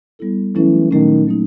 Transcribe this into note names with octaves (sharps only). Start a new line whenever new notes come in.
G3 B3 E4 A4
E3 F#3 A3 C#4 E4 A4
A#2 D#3 F#3 A3 C#4
F#3 A#3 D#4